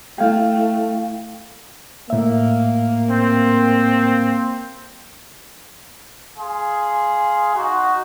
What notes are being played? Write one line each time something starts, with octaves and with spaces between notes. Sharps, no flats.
A3 E4 F5 G5
A2 A#3 E5
C4
G#4 F5 C6
D#4 F#4